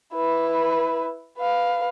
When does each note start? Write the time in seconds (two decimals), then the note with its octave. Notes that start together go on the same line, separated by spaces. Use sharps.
0.15 E4 B4
1.38 B4 F5